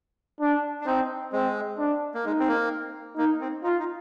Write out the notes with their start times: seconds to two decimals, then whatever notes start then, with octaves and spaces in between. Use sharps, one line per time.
0.40 D4
0.81 D4
0.86 C4 D#4
1.33 G#3 C4
1.78 D4
2.14 A#3
2.25 G#3 D#4
2.39 C4
2.48 A#3
3.17 A#3 D#4
3.41 C4
3.64 D#4 F4
3.79 D#4